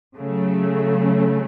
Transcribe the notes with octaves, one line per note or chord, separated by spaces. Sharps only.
C#3 F#3 A3